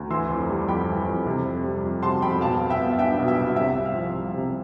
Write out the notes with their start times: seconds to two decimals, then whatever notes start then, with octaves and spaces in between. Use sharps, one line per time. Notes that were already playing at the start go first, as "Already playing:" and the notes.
Already playing: D2
0.10 E3 C6 E6
0.30 F2
0.50 G3
0.68 F2 G5 B5
0.88 E3
1.07 F2
1.26 C3
1.45 F2
1.64 G3
1.84 F2
2.03 C3 A5 C6
2.22 F2 G5 B5
2.41 B2 F5 A5
2.61 C2
2.70 E5 G5
2.80 B3
2.99 D4 E5 G5
3.19 B2
3.28 E5
3.37 C2
3.56 C3 E5
3.76 C2
3.85 F5
3.95 F3
4.15 C2
4.34 C3